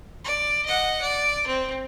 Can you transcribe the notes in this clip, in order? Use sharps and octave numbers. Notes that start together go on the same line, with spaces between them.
D5
D#5 F#5
D5
C4